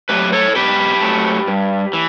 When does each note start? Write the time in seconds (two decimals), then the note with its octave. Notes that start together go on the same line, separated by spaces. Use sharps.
0.09 F#3 A3 G4 B4
0.33 A4 C#5
0.55 B2 G4 B4
1.01 F#3 A3
1.48 G2
1.93 E3